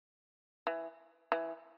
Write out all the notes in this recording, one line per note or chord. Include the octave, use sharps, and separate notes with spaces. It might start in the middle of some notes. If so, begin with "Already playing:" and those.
E3
E3